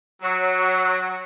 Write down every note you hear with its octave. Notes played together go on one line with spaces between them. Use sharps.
F#3